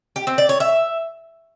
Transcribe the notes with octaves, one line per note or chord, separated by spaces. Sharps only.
G4
C4
D5
C#5
E5